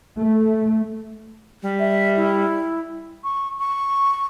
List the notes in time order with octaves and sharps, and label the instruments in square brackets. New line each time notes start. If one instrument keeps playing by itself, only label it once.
[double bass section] A3
[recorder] G3
[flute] E5
E4
C#6
C#6